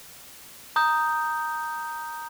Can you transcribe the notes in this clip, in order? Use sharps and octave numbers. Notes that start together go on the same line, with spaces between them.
A#5 D#6 G6